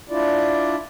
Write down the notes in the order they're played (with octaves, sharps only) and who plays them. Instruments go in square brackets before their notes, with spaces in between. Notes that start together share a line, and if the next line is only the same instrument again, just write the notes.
[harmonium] D4 E4 F4 D5